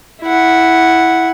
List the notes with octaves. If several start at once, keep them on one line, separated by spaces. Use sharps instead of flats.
E4 F#5